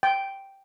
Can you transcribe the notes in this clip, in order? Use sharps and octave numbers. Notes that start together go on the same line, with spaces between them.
G5